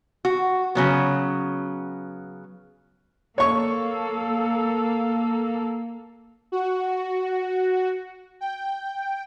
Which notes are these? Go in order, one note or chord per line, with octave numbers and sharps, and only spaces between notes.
F#4
C#3 F#3 B3
A#3 A4 C#5 C#6
F#4
G5